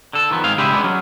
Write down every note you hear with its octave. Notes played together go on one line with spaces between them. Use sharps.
D3 A4
D#3 F3 B3
G#2 C4 G#4 F5
C#3 G#3 D4 E4 G4 G#4
G#3 B3 C4 D4
F#3 C#4